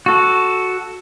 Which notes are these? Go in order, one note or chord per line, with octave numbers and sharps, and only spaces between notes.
F#4 A4